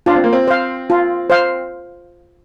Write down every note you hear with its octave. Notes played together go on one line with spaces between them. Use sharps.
D4 F4
C4
A#3
C4
C5 F5
F4
C5 F5